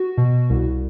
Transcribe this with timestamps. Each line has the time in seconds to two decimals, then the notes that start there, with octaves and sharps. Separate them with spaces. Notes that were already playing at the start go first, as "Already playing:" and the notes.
Already playing: F#4
0.17 B2
0.50 C2